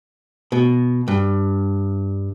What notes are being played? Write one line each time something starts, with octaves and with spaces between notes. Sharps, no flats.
B2
G2